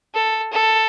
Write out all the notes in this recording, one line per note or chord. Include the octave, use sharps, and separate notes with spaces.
A4
A4